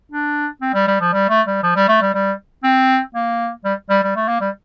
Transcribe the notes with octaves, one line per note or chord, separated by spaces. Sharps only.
D4
C4
G3
G3
F3
G3
A3
G3
F3
G3
A3
G3
G3
C4
A#3
G3
G3
G3
A3
A#3
G3